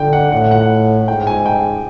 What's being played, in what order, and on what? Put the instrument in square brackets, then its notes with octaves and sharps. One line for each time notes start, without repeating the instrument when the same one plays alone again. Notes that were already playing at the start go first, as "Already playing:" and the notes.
Already playing: [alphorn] D3 [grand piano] G5
[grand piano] F#5
[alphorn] A2 [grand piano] F#5
[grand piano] F#5
[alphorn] G#2 [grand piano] G5
[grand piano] G#5
G5